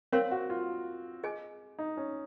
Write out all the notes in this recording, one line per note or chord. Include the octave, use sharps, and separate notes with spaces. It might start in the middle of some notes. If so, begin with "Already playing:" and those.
C4 A#4 C#5 F5 C6
F#4
F4
G#4 D#5 G#5
D#4
C#4